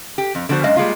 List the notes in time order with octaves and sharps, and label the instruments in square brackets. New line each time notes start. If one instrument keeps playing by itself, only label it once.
[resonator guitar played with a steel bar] G4
F2
D3 F3 B3 F#4 C5
F#2 G#3 D#5 F5
G3 G#3 A#3 F4